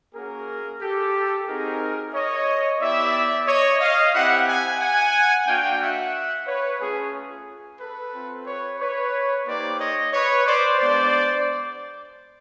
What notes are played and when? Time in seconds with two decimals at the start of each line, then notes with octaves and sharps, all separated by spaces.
0.14 A#3 C#4 F#4 G#4 A#4
0.81 G4 A4
1.47 C4 D#4 F#4 G#4 A#4
2.13 C#5 D#5
2.80 B3 E4 G4 D5 E5
3.47 C#5 D#5
3.80 D#5 F5
4.13 C4 E4 G4 E5 F#5
4.47 F#5 G#5
4.80 F#5 G#5
5.47 A#3 D4 F#4 F5 G5
5.80 E5 F#5
6.47 B4 C#5
6.80 A3 C#4 F4 G#4
7.80 A4 B4
8.13 C4 F4
8.46 B4 C#5
8.79 B4 C#5
9.47 A#3 D#4 G4 C5 D5
9.80 C#5 D#5
10.13 B4 C#5
10.46 C5 D5
10.79 G#3 B3 D4 C5 D5